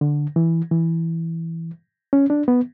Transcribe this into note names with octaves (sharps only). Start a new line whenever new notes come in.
D3
E3
E3
C#4
D4
B3